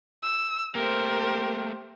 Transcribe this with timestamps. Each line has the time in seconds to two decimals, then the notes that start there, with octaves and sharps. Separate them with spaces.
0.23 E6
0.75 A3 A#3 G4 A#4 C5